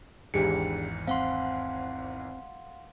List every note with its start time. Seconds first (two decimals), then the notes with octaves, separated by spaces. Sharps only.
0.34 G#1 E2 G#2 D4 G4 G#4 C#7
1.07 C4 F5 F#5 C6